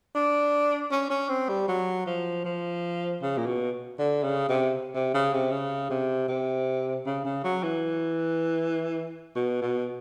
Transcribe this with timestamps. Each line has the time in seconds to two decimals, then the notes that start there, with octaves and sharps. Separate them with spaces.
0.15 D4
0.91 C#4
1.10 C#4
1.29 C4
1.49 G3
1.68 F#3
2.06 F3
2.45 F3
3.22 C#3
3.38 A#2
3.47 B2
3.99 D3
4.23 C#3
4.49 C3
4.95 C3
5.14 C#3
5.33 C3
5.51 C#3
5.90 C3
6.28 C3
7.06 C#3
7.25 C#3
7.44 F#3
7.63 E3
9.36 B2
9.62 B2